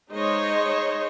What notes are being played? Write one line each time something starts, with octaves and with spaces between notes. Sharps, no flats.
G#3 D#4 C5 C#5 D#5